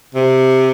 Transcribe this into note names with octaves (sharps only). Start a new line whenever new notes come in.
C3